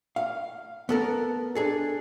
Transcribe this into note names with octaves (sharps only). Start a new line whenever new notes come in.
F5
B3 A4 A#4
D4 G#4 A4